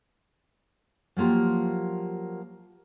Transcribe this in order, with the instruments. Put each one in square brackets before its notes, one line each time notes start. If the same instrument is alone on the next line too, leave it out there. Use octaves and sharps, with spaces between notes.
[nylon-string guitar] F3 F#3 A#3 F4 G4